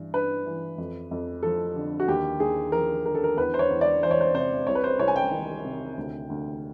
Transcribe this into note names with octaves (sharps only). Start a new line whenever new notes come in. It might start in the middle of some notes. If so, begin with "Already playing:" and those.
Already playing: G2 E3
G2 B4
E3
F2
F2
F3 A4
D3
F#4
D#2 G4
D#2 G#4
F3 A#4
D3 A#4
A4
A#4
E2 B4
C5
C#5
E2
D5
E3 C5
C#5
C5
C3 C5
C2 C#5
B4
C5
C2 C#5
G#5
G5
D#3
C3
D2
D2